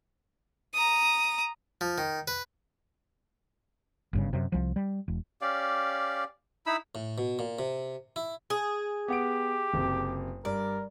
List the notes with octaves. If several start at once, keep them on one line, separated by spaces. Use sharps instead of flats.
A#5 D#6
F3
D#3
B4
G1 G2 C#3
F#2 C3
C2 F3
G3
E1
C#4 G4 D5 F5
D#4 E4 B5 E6
A2
B2
A#2
C3
E4
G#4
B3 G4 F#5 D7
F#1 C3
G2 A#4 D5